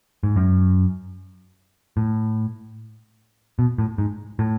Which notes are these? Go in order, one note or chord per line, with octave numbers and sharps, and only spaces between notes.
G#2
F#2
A2
B2
A2
G#2
A2